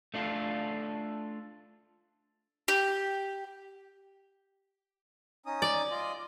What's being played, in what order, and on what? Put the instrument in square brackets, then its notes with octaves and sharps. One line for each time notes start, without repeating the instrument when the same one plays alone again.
[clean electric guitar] A3 D4 F4 A4
[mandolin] G4
[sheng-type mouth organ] C#4 D#4 D#6
[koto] D5
[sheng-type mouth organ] F4 D#5